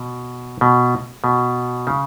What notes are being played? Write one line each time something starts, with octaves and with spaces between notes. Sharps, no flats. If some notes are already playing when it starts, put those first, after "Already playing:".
Already playing: B2
B2
B2
C#3